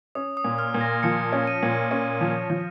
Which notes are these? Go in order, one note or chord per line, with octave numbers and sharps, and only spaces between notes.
C#4 D#6
D#6
A#2
F6
A#2
A#6
F3 C#7
C#4
D#7
A#2
C#4
F3
F3